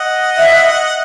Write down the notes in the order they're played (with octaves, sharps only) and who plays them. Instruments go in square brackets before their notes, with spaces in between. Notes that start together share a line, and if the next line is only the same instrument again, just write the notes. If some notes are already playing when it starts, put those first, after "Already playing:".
Already playing: [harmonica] D#5 F#5
[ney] E5